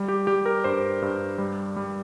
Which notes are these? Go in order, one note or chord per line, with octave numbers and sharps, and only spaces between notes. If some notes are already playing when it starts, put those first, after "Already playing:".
Already playing: G3
G4
G3 G4
A#4
G2 C5
G2
G3
G3